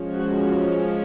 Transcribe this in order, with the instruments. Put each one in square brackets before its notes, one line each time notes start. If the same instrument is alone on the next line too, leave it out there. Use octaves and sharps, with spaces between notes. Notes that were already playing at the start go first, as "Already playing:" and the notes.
Already playing: [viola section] F3 G#3 C#4
F#4